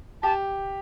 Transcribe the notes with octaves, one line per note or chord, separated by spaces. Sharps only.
G4 A5